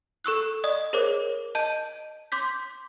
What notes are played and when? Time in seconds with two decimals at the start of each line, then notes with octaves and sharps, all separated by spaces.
0.24 A4 C#6 E6 F#6
0.64 D5 D#5 D#6
0.93 G#4 A#4 C5 C#5 D6
1.55 D#5 A5 G6 D#7
2.32 C6 D6 G6 B6